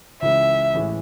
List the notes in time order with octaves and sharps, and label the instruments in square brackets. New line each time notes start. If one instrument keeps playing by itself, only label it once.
[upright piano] C#2 C#3 E3 G#3 [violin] E5
[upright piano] A1 A2 E3 G#3